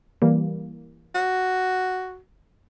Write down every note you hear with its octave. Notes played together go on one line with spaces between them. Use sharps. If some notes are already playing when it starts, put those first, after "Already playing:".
E3 G3 A#3
F#4